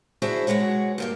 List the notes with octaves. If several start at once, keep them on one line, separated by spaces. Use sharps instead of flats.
D4 E4 F#4 G#4 C5 E5
B2 F#3 G#3 F#4 C#5
G2 A#3 G4